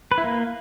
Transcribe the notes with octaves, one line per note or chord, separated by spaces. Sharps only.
B4
E4
A#3